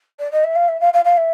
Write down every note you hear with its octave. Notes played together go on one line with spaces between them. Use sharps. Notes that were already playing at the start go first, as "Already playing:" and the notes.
D5
D#5
E5
F5
E5
F5
F5
F5
E5